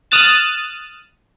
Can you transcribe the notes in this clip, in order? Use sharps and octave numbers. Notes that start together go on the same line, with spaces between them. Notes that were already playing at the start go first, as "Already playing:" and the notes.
D#6 F6 F#6 A6 E7